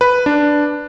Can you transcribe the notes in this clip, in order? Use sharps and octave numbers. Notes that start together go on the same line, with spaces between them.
B4
D4